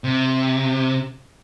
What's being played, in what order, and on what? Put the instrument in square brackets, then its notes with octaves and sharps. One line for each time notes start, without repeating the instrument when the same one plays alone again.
[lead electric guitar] C3